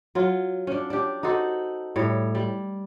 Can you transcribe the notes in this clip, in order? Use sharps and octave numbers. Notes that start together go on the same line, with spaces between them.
F#3 F4
C#4 D4
D4 G4
D#4 F#4 A4 C5
A2 G3 C#5
G3